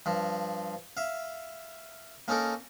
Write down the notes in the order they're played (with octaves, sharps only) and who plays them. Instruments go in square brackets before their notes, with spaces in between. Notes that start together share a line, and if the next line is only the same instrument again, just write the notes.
[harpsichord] G2 F3
E5 F5
A#3 C#4 D#4 A4 A#4